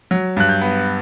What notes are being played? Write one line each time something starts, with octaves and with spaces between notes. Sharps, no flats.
F#3
G2 F#6
G6
B3